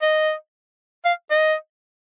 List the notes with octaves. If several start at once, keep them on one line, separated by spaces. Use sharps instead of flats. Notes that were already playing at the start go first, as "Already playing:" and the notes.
D#5
F5
D#5